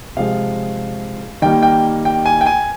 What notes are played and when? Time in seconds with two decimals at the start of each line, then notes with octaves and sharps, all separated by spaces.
0.17 C3 F3 G#3 F5
1.42 D#3 G3 A#3 G5
1.63 G5
2.05 G5
2.26 G#5
2.41 G5
2.46 G#5